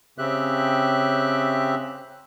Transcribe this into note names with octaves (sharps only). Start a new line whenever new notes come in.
C#3 C4 G4 E5 F#6